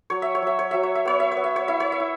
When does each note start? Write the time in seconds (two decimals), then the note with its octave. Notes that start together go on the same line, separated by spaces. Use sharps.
0.10 F#3 C#5
0.22 E5
0.35 C#5
0.42 F#3 E5
0.59 C#5
0.71 F#3 E5
0.83 C#5
0.95 E5
1.05 B3 C#5
1.20 E5
1.32 C#5
1.37 B3
1.44 E5
1.56 C#5
1.68 E4 E5
1.80 C#5
1.92 E5
2.00 E4